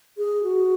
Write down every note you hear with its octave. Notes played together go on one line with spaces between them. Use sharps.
G#4
F#4